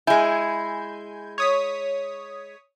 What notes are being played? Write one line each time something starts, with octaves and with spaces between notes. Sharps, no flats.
G#3 E4 G#5 G6 G#6
C#5 D#6 B6